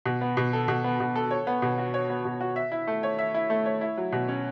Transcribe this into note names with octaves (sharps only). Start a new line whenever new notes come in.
B2
B3
B2
A4
B2
B3
B2
A4
C#5
B3
B2
F#4
C#5
B3
B2
F#4
E5
E4
A3
C#5
E5
E4
A3
C#5
E4
F#3
B2
C#4